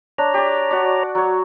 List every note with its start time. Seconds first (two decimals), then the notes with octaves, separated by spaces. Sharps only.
0.18 D4 C#5 A#5
0.34 G4 D5
0.71 F#4 D5
1.15 F#3 C#5